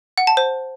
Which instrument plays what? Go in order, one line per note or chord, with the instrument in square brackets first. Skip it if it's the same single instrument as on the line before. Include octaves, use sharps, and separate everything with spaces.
[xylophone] F#5
A5
C5